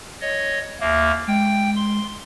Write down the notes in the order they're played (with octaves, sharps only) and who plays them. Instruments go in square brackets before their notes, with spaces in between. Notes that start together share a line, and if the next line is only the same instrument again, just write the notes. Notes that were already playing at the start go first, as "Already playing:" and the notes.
[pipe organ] C#5 D#5
[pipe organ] D#2 A#3 [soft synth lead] E5
[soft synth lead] G#3 [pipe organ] G5
[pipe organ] C6